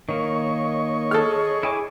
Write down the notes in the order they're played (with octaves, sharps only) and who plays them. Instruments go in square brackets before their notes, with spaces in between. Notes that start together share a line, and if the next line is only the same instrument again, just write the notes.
[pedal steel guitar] D#3 A#3 [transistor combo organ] C#5 D#5 C#6
[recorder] G#4 [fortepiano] A4 F6
[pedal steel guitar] E4 G#5 D6